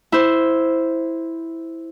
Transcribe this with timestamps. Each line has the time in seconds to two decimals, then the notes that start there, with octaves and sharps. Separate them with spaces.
0.12 E4 C5